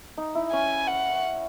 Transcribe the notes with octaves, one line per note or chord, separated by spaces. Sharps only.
D#4
E4
C#4 G#5
F#5